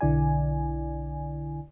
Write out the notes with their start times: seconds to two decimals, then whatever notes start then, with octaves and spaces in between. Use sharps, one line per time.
0.01 B1 D3 E4 D5 G#5